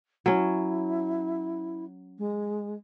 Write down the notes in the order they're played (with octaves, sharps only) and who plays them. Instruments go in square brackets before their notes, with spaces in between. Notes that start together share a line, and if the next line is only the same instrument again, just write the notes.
[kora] F#3 C#4 [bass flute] E4
[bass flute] G#3